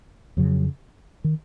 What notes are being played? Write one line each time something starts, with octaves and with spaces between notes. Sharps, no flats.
F2 C#3 F#3
D#3